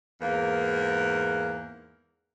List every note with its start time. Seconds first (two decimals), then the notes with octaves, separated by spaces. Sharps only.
0.21 E2 G#2 A#3